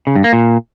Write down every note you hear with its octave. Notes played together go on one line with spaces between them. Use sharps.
C#3
G2
A#3
A#2